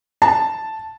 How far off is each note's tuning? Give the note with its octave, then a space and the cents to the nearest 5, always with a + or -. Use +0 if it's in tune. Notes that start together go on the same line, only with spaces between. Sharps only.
A5 +0